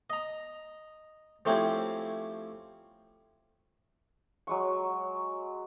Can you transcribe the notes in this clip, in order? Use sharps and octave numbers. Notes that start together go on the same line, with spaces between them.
D#5 A#5
F3 A3 C4 C#4 E4 G4
F#3 G#3 C#6